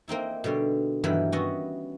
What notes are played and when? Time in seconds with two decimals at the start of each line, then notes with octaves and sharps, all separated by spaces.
0.08 A#3 C4 D#4 E4
0.44 B2 D3 G3 D4
1.04 G2 D#3 E3 F#3 B3 B5
1.32 G3 B3 C#4 E4 F#4 D#5